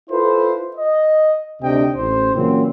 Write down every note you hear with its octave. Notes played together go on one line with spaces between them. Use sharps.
E4 F4 A4 B4 C5
D#5
D2 C3 D4 D#4 D#5 G5
A1 C5
A#2 C#3 E3 F#3 C4